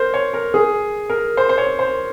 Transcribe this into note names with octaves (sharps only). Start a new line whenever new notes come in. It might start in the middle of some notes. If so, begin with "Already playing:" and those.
Already playing: A#4 C5
C#5
A#4
G#4
A#4
C5
C5
C#5
C5